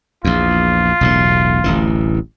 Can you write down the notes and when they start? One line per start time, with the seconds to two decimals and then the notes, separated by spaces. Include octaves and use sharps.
0.25 A#1 E2 F4
1.01 E1 B1 A2
1.64 D1 A1 E3